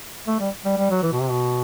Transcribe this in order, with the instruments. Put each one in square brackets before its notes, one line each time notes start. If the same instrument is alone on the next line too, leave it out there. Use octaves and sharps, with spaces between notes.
[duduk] A3
G3
G3
G3
F#3
E3
B2
C3
B2